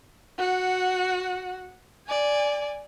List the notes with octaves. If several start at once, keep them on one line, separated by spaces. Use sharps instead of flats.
F#4 F#5
D5 G#5